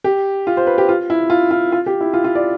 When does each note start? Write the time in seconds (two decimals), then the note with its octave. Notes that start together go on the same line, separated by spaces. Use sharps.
0.04 G4
0.47 F4
0.57 C5
0.67 B4
0.78 G4
0.89 F4
1.10 E4
1.30 F4
1.51 F4
1.72 F4
1.86 G4
2.01 E4
2.14 F4
2.24 F4
2.35 D5